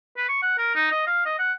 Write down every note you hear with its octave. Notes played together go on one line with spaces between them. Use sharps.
B4
C#6
F#5
A#4
D#4
D#5
F5
D#5
F#5